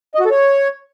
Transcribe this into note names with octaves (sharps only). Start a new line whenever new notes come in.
D#5
F#4
A4
C#5